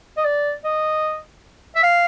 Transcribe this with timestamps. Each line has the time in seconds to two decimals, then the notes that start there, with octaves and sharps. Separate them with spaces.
0.17 D#5
0.25 D5
0.64 D#5
1.76 E5
1.83 F5